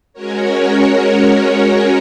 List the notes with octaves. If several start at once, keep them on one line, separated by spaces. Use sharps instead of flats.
G#3 C#4 F#4 A#4 C#5